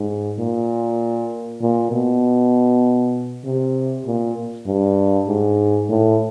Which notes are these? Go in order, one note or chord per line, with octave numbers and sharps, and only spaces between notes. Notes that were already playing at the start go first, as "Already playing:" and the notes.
Already playing: G#2
A#2
A#2
B2
C3
A#2
G2
G#2
A2